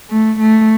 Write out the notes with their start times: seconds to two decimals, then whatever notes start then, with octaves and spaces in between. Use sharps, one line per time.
0.10 A3
0.39 A3